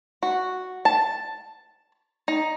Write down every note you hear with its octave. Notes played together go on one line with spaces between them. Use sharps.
F#4
A5
D#4